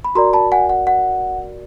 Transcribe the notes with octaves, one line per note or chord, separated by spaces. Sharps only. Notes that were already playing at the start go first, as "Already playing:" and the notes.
B5
F#4 A#4 D5 A#5 C6
A5 B5
F#5 G#5
F#5
F#5